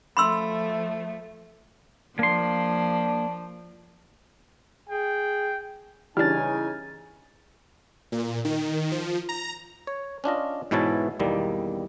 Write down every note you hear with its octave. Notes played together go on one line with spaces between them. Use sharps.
F3 A3 B5 C6 E6
F3 A#3 D4 C6
G#4 G5
C#3 E3 G3 D4 D#4 G#5 F6 A6
A#2
D#3
F3
A#5
C#5
C#4 D4 F4 D#5
G#2 B2 E3 E4 C#5 A5
B1 E2 D#3 G3 A#3